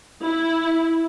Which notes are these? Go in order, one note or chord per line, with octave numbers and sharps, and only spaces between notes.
E4